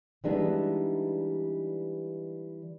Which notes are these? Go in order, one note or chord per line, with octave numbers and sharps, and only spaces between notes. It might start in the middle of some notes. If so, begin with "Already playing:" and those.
E3 G3 G#3 B3 D4 D#4